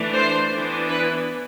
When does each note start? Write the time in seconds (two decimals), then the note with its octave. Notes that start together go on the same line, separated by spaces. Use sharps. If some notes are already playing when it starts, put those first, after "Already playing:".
Already playing: E3 A3 D4
0.13 C5
0.51 E3 B3 D4
0.90 B4